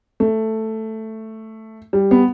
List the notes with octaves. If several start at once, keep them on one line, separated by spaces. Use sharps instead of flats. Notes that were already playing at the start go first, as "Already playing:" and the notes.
A3
G3
B3